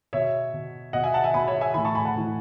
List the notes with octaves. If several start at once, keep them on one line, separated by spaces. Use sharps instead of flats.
B2 C#5 E5
B2
B2 D#5 F#5
E5 G#5
F#5 A5
E5 G#5
B2 G#5 B5
C#5 E5
E5 G#5
A2 E3 G#5 B5
A5 C#6
G#5 B5
F#5 A5
A2 E3